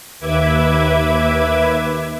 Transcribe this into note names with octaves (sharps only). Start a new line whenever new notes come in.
D#2 B4 E5 D6 G#6